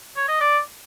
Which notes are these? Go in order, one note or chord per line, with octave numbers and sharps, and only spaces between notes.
C#5
D#5
D5